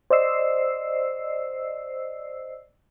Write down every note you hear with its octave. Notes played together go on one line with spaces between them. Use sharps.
C5 D5 D#5 E6 C7